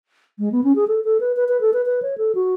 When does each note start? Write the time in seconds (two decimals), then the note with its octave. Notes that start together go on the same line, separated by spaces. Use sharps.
0.39 G#3
0.52 B3
0.64 C#4
0.76 G#4
0.88 A4
1.04 A4
1.20 B4
1.36 B4
1.49 B4
1.61 A4
1.73 B4
1.86 B4
2.02 C#5
2.18 A4
2.35 F#4